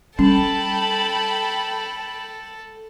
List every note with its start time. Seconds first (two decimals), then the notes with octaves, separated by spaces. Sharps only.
0.19 G3 C#4 A4 G5 A5 B5